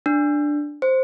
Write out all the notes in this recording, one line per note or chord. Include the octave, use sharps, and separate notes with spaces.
D4
C5